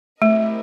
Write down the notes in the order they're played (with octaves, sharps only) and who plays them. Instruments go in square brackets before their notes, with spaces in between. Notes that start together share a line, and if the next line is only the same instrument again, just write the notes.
[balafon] A3 [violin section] C4 E4 G4 A#4 D#5